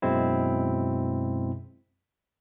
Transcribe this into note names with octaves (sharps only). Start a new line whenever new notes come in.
F#2 B2 G#3 C4 E4